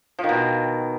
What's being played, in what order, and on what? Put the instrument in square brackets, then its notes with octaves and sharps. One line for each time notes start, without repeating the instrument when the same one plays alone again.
[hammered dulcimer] F3
D#3
B2